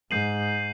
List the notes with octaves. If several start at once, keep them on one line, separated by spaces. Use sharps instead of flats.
G#2 G6 C7 D#7 F#7